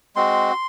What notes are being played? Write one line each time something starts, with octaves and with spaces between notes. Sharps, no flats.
G#3 C4 F#4 C6